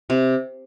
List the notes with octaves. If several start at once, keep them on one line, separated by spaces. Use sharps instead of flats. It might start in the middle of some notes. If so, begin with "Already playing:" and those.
C3